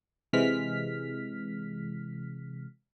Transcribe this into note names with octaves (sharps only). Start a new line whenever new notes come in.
C3 E3 G#3 F6 B6